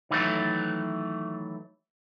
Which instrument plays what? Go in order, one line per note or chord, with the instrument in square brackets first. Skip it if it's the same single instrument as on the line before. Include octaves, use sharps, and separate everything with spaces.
[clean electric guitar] D#3 E3 F#3 A3